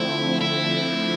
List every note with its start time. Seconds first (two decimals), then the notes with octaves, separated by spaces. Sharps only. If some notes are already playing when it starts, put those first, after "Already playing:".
Already playing: D3 F3 A3 C4 E4
0.41 E4